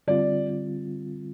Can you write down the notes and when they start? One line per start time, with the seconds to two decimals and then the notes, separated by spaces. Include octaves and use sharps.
0.07 D3 G3 C4 F4 D5